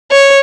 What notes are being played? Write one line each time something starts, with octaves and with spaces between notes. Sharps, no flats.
C#5